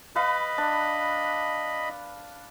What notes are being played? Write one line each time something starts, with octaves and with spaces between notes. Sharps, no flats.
B4 D#5 F5 B5
D4